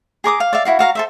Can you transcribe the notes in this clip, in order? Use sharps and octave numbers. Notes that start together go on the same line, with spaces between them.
G#4 A#4 D6 D#6
F5
D5 E5 F5
E4 F#4 F5
F#4 F5 A#5
A4 C5 E5